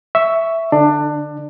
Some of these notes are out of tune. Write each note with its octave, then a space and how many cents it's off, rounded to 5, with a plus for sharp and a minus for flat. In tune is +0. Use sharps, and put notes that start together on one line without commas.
E5 +0 C#6 +10
D3 +0 D4 +20